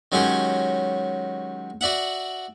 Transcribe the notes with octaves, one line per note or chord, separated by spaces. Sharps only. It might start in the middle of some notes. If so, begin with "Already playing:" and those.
D#3 F#3 G#3 C#4 G4 C#5
F#4 D5 E5 F#5